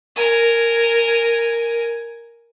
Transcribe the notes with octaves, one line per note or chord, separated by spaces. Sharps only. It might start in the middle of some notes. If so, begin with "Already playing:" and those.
A#4 G#5